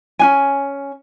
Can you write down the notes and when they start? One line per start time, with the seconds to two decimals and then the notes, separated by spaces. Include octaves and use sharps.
0.19 C#4 D4 G#5